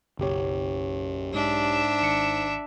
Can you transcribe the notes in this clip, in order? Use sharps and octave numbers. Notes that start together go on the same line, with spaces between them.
F#1 B1 G4 C#5
G#2 D4 E5
G#1 C#7